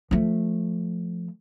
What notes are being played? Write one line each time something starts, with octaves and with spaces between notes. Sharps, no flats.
F3 A3